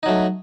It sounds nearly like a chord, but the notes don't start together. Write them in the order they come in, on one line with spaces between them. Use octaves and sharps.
D#4 F#3 A3